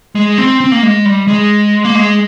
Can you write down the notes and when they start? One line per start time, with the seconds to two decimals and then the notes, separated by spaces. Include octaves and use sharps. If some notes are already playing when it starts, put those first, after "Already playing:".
0.15 G#3
0.38 C4
0.60 C4
0.72 A#3
0.83 G#3
1.05 G3
1.27 G#3
1.85 A#3
1.95 G#3